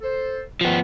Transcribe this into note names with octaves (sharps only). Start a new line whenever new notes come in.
A4 C5
D#3 F3 B3